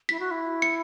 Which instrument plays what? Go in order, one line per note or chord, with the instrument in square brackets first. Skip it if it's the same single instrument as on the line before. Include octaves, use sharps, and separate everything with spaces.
[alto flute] E4 [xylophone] B6
[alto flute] F#4
E4
[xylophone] C#7